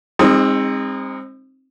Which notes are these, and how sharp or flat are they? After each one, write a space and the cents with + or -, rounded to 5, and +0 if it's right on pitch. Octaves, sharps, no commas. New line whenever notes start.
G#3 -35 C4 +20 D#4 +0